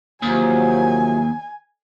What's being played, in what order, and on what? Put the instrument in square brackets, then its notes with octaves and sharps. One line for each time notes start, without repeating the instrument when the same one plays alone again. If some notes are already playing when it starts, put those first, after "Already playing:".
[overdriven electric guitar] D#2 [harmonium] C3 F3 F#3 [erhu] G#5